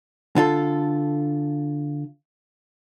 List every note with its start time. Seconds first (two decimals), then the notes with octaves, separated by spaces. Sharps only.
0.36 D3 F4 A4